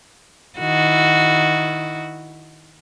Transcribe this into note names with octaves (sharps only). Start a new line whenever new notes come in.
D#3 E4 F#4